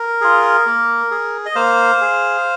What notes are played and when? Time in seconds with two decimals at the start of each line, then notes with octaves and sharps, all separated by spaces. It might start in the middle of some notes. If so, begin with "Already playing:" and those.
Already playing: A#4
0.21 F4 G#4
0.66 A#3
1.11 G#4
1.46 D#5
1.55 A#3 C5 F5
2.01 G#4